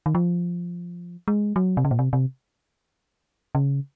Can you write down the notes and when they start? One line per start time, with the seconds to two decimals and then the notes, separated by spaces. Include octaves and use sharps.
0.06 D#3
0.15 F3
1.28 G#3
1.56 F#3
1.77 C3
1.85 C#3
1.91 A#2
1.99 C3
2.13 C3
3.55 C#3